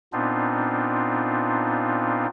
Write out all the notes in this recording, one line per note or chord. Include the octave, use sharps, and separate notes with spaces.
A#2 B3 C4 D4 D#4 F4